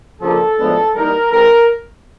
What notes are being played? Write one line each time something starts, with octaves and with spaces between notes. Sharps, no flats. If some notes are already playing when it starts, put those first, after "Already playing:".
C#3 F3 A#3 D4 A4
A2 F3 G#3 B3 D4
E3 G3 A#3 D#4 A#4
E3 G#3 C4 A#4